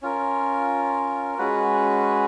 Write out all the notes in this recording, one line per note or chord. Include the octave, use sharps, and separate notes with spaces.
C#4 F4 A#4
G#3 C#4 F#4 B4